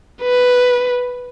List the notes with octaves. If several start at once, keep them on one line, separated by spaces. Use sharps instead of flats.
B4